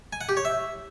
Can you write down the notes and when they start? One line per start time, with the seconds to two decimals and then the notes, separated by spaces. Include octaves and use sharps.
0.13 G#5
0.21 F#5
0.29 G4
0.37 C#5
0.45 E5